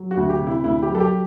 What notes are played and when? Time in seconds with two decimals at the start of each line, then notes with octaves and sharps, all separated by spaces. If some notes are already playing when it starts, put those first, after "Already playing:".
Already playing: F#3
0.11 F#4
0.17 D2
0.29 G4
0.41 C3
0.47 E4
0.64 D2 E4
0.82 G4
0.88 F#3
0.95 A4
1.00 G4